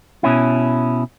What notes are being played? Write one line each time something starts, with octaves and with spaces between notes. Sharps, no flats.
B2 C#4 E4